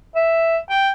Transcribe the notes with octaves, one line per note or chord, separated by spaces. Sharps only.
E5
G5